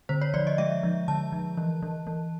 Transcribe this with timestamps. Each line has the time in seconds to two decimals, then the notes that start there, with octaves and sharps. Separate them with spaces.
0.09 D3 C5
0.22 C#5
0.34 F3 D5
0.47 D#5
0.58 G#3 E5
0.83 F3
1.08 D3 A5
1.32 F3
1.57 E3
1.83 E3
2.07 E3